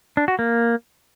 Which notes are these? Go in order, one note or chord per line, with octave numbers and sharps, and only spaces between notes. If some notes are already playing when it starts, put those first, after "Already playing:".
D4
F#4
A#3